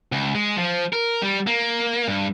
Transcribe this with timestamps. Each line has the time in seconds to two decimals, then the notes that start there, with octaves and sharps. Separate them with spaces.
0.12 C#2
0.35 G#3
0.58 F3
0.93 A#4
1.22 G3
1.47 A#3
2.08 G2